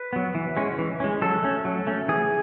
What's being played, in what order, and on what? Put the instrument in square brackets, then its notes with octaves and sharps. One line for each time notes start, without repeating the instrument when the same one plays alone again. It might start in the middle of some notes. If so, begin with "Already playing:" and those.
Already playing: [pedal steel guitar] B4
F#3 B3
E3
G#3 C#4
E3
G#3 C#4
F#3 A4
A3 C#4
F#3
A3 C#4
E3 G#4